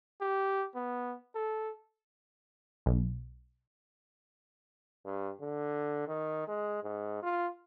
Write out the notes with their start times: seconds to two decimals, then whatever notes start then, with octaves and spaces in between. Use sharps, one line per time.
0.21 G4
0.75 B3
1.35 A4
2.86 B1
5.05 G2
5.41 D3
6.07 D#3
6.48 G#3
6.83 G#2
7.23 F4